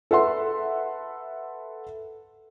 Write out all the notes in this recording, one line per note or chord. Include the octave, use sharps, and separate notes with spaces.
A4 B4 E5 F#5 C6